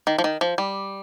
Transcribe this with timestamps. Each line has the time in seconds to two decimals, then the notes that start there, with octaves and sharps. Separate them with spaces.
0.07 D#3
0.18 F3
0.24 D#3
0.41 F3
0.58 G3